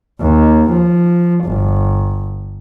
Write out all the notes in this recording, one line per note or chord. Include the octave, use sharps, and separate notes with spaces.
D#2
F3
G1